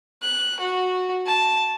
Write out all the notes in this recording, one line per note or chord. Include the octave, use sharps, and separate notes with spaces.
F#6
F#4
A5